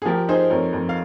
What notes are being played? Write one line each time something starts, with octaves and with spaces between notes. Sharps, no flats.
G#4
F3 G4 A#4
D#4 G#4 C5
F2 A#4 C#5
F2
F5